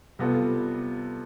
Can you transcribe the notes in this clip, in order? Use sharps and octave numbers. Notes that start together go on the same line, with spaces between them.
C3 G3 B3 F4 A4